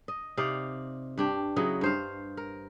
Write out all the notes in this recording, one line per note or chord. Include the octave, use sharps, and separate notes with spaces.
D#5
C3 D#4 D5 F5
G2 D4 G4
C#3 F#3 E4 D#5
G2 C5 F5
A#4